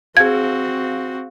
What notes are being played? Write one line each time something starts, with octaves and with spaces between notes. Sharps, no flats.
C4 F#4 G#4 F5 G#6